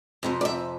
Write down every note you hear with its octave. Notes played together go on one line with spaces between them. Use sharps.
F2 C3 F3
D5
E5